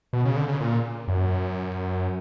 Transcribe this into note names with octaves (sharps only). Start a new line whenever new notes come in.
B2
C#3
D3
C#3
A#2
F#2